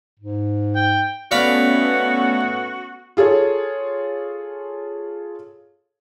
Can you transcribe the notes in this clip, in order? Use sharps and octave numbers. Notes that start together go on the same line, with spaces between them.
G#2
G5
A3 B3 C#4 F#4 D5 F5 B5
F4 G#4 A4 C#5